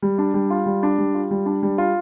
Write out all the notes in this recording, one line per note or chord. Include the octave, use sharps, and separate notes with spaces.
G3
D4
G3
F4
G3
D4
G3
F4
G3
D4
G3
F4